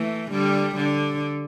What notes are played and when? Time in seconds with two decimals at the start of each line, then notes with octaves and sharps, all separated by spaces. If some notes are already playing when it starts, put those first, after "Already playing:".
Already playing: E3 A3
0.31 D3 G3
0.75 D3